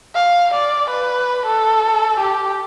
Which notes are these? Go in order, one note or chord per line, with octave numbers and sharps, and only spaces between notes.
F5
D5
B4
A4
G4